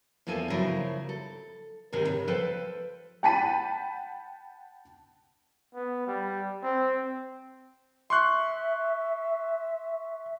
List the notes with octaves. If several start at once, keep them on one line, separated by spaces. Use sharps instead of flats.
E2 F3 A#3 A4 G#5
C#3 F3 F#3 E4 A#4 C5
A4
D#2 G#2 C3 D#3 G#3 G#4
C#3
F3 A4 B4 C5 G5
F#5 G5 A5 B5 B6 D#7
B3
G3
C4
E5 C6 C#6 F#6